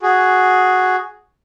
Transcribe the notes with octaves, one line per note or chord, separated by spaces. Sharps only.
F#4 G#4